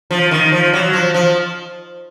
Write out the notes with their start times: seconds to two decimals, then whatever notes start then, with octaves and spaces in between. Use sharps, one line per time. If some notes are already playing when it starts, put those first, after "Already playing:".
0.11 F3
0.31 D#3
0.52 F3
0.73 F#3
0.93 F3
1.14 F3